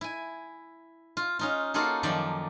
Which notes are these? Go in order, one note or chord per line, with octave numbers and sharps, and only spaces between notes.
E4 G#5
F4
C#4 D#4 F4
A#3 D#4 F4 F#4 G#4 A4
F#2 D#3 F3 D5 G5